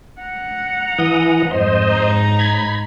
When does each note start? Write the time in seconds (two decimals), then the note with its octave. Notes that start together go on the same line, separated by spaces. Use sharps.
0.20 F#5 A#5
0.99 E3 D#6
1.51 F2 G#2 G3 C5 D#5
1.90 G#2 D#4 A#5
2.39 B5 G#6